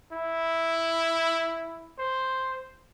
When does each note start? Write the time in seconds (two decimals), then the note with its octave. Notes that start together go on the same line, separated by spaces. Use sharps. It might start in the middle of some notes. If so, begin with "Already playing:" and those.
0.12 E4
1.99 C5